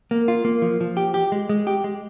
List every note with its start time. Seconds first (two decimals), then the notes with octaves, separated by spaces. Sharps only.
0.11 A#3
0.28 F4
0.45 A#3
0.62 F3
0.81 F3
0.97 G4
1.14 G4
1.32 G#3
1.49 G#3
1.67 G4
1.84 G#3